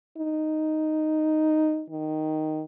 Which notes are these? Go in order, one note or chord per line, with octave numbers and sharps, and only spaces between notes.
D#4
D#3